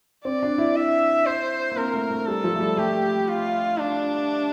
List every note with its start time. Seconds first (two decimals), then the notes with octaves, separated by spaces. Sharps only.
0.25 C4 D5
0.42 D4
0.58 E4
0.76 E5
1.26 C5
1.72 A#3
1.77 C4 A#4
1.94 A3
2.11 A3
2.27 G3 A4
2.44 F3
2.54 A3
2.60 G3
2.77 A3 G4
3.28 F4
3.79 D4